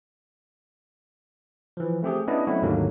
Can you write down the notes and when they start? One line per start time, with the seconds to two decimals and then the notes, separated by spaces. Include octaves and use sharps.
1.77 E3 F3
2.03 A3 C4 G4 G#4
2.27 B3 C#4 D4 E4 D5 D#5
2.47 F#3 A3 C4 C#4 E4 F#4
2.62 D#2 G#2 D3 D#3 F#3 A#3